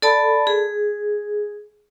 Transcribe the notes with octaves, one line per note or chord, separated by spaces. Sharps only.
A4 D5 A5 B5
G#4